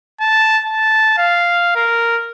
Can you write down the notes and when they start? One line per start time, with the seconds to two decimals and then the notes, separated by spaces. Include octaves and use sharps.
0.20 A5
0.65 A5
1.18 F5
1.76 A#4